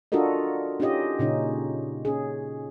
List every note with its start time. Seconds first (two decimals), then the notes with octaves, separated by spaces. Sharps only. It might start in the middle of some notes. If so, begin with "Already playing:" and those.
0.12 D4 F4 F#4 A4 A#4 D#5
0.80 C#4 D#4 F4 G4 D#5
1.19 A#2 C#3 C#4 D#4
2.05 C#4 G#4